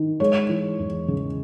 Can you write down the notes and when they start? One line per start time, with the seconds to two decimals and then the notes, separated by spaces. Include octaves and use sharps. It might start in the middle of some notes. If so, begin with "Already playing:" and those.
Already playing: D#3
0.20 G#3 C#5
0.49 E3
0.79 E2
1.08 C#3